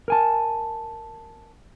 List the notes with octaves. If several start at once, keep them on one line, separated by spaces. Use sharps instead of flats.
A#4 G#5 A5